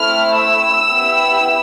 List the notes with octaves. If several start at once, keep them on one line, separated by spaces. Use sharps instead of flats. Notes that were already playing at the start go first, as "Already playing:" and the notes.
Already playing: A3 C4 E4 F6
E6
B3 E4 G4